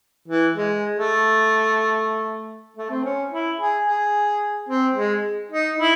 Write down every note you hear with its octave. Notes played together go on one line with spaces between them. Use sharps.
E3
G#3
A3
A3
C4
C#4
E4
G#4
G#4
C4
G#3
D#4
E4